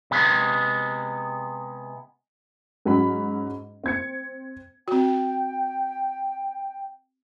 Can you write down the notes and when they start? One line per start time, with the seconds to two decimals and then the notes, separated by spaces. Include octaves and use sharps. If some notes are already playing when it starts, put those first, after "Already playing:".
0.11 C3 G#3 B3
2.85 G#2 F#3 C#4 B5
3.84 C4 G#6 C#7
4.88 C4 F#4 G5